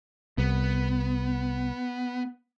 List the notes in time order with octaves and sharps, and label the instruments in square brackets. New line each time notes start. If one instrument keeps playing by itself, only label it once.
[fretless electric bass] C2 [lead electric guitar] B3